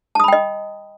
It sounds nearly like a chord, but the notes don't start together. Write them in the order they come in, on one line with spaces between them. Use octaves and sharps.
A5 D#6 B5 G5 D#5